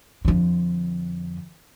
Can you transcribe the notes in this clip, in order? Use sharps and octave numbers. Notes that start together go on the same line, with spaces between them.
F2 D3